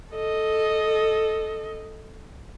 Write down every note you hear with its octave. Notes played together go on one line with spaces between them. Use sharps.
A4 D#5